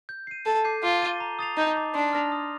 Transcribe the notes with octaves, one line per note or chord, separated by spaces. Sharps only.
G6
C7 D#7
A4 A5
D6 G6 C7 D#7
F4 D6
A6 D#7 G7
A#5
D#6 A6 C7 F7
D#4 A5
D6 A6
D4 C6
F6 A#6 F7
D#6